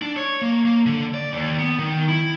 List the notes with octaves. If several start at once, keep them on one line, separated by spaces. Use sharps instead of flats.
D4
C#5
A#3
A#3
D3
D5
D#2
B3
D#3
E4